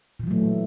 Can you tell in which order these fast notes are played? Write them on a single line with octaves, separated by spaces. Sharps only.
A#2 E3 F#3 A3